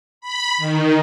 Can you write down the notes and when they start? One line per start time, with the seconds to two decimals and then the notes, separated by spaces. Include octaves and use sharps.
0.21 B5
0.58 D#3